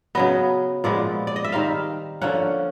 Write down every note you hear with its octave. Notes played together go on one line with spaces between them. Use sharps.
C#3 F#3 B3 D#5
A#2 F3 G#3 B3 D5
D5
D#5
E5
D#3 G3 C4 D#4 F5
D3 F3 A#3 C#4 F#5